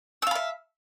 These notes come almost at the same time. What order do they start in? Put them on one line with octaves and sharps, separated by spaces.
E6 F5 B5 E5